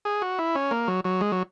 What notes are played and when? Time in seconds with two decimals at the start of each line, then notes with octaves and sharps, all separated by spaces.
0.05 G#4
0.22 F#4
0.39 E4
0.55 C#4
0.71 A#3
0.88 F#3
1.04 F#3
1.21 G#3
1.32 F#3